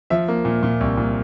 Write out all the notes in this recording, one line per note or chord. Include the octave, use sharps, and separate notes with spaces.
F3 E5
A#3
A#2
A#2
C2
A#2